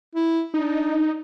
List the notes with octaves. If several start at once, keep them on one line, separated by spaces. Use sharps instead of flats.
E4
D4 D#4